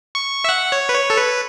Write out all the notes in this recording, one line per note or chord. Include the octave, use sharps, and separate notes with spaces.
C#6
E5
F#5
C#5
B4
C#5
A4
B4